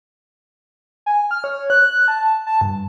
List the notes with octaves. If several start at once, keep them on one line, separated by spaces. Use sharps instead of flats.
G#5
F6
C#5
F#6
F#6
A5
A5
G2